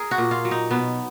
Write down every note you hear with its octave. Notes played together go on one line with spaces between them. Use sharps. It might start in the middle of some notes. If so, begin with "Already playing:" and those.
Already playing: G#4 A#4
F#4
A#2
F4
F#3
D#4
B2 B3